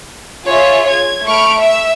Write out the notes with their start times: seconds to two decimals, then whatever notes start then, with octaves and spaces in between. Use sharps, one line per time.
0.47 F4 G#4 C#5 E5
0.89 G#6
1.27 A3 B5 C#6 F6 D7
1.58 E5 E6